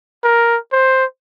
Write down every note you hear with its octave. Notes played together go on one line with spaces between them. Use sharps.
A#4
C5